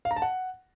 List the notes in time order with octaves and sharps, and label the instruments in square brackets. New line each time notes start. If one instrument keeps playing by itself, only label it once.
[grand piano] F5
A#5
A5
F#5